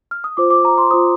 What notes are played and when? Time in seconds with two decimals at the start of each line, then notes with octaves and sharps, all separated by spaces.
0.11 F6
0.24 D#6
0.37 F4 C5 D6
0.50 D6
0.65 A#5
0.78 C6
0.91 F4 C5 D#6